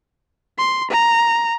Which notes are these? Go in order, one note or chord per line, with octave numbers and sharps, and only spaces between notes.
C6
A#5